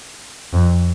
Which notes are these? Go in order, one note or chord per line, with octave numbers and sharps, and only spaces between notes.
F2